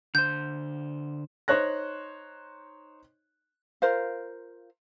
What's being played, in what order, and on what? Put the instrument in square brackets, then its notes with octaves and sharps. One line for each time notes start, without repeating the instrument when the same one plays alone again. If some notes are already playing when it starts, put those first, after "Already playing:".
[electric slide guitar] D3 C5 [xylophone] G6
[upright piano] D#4 C5 C#5 F#6 A#6
[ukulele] F4 A#4 C5 F5